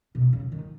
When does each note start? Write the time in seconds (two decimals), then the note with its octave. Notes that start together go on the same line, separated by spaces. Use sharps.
0.15 B2
0.33 C#3
0.52 D#3